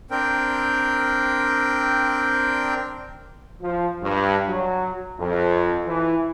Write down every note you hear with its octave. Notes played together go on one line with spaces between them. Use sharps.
C4 D4 A#4 G5
F3
G2
F#3
F2
E3